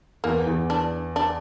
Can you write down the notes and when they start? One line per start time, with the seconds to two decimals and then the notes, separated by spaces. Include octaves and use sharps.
0.24 E2 A#3
0.47 E2
0.70 D4
1.16 D4